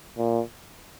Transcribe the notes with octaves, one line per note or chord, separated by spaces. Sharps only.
A#2